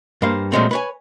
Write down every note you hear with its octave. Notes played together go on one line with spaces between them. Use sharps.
G2 A#3 C5 F5
A#2 F3 F#3 G#3 A3 C4
B4 C#5 G#5